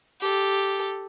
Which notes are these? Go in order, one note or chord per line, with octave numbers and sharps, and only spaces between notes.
G4 A4